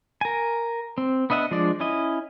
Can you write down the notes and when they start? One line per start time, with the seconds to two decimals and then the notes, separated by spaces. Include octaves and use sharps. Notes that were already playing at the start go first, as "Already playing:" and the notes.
0.21 A#4 G#5
0.98 C4
1.30 B3 D4 D#5 E5 F#5
1.51 F3 G#3 D4 D5
1.80 C#4 E4 D#5